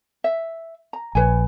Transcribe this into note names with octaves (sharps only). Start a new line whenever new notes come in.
E5
A#5
A#1 B4 C#5 G#5